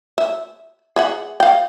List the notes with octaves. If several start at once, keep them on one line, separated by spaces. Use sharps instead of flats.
E5
G#4 E5 F#5
F5 G5